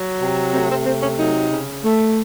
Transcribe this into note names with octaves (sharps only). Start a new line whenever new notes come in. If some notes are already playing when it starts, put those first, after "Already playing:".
Already playing: F#3
C3
A3 C4
C4
C3 C4
C#4
F#3 D#4
C#3
A3